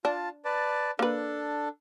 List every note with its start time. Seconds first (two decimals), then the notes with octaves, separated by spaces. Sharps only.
0.05 D4 F4 A5
0.45 B4 D5 A5
0.99 A#3 D4 A4 B4